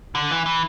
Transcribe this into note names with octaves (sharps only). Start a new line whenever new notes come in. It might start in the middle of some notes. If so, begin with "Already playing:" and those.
D3
E3
E3